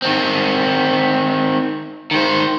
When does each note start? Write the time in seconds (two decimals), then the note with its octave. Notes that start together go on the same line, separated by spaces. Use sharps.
0.02 D#3 C4
2.11 D#3 C5